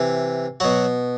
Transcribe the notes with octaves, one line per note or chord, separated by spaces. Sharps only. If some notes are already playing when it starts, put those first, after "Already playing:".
Already playing: C3 E3
B2 F#3 F#4